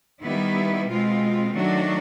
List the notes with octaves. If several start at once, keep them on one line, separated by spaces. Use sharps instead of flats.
D#3 G3 B3 E4
B2 G#3 C4 F4
D#3 F#3 A3 D4 F#4